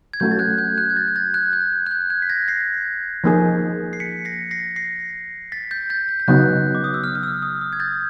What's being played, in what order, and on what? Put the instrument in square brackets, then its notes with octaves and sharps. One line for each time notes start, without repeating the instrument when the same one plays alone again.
[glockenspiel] G#6
[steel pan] F#3 A3 C#4 F#4 [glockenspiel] G6
[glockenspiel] A6
F#6 G#6
G6
F#6 G#6
G#6
G6 A6
G#6
G6 A6
F#6 G#6
G6
F#6
F#6
G6
F#6 G#6
B6
G#6 A#6
A#6 C7
[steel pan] F3 A#3 D#4 G#4
[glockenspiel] C7
B6 C#7
A#6 C7
A#6 C7
A#6 C7
A6 B6
G6 A6
G6 A6
G6
G6
[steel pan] C#3 F#3 B3 D#4 [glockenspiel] F#6
[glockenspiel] D6
D#6
E6
F6
F6
E6
D#6
D#6
G#6
G6 A6